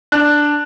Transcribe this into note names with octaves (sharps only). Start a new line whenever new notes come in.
D4 F#6